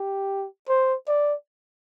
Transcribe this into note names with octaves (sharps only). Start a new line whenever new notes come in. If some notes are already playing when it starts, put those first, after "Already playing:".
Already playing: G4
C5
D5